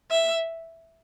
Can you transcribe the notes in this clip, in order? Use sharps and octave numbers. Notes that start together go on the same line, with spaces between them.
E5